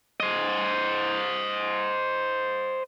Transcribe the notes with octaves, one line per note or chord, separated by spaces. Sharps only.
C5 D#5